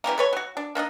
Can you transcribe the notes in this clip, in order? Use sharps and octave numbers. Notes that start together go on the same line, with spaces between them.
C#3 E3 G3 A#3
A4 B4 C#5
F#3 F#4
D4
A#3 D4 D#4 D#5